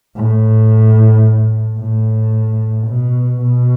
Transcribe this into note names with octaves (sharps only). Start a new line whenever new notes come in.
A2
A2
B2
B2